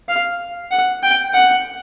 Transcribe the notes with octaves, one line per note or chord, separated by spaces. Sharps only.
F5
F#5
G5
F#5